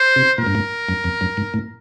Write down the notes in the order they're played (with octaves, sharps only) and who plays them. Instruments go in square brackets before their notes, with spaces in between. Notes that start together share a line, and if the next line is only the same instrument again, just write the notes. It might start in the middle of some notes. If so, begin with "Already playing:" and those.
Already playing: [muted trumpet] C5
[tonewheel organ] C3
[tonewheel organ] A#2 [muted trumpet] A#4
[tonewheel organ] G2
G#2
F#2
F2
F#2
G#2
A2